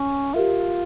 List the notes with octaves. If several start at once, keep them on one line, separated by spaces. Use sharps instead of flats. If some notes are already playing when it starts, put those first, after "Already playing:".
Already playing: C#4
F4 G4 A#4 E5